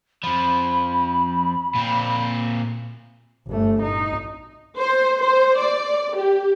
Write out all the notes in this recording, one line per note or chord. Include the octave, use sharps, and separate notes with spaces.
F2 F3 B5
A#2 C4
G1 A3
D#4
C5
C5
D5
G4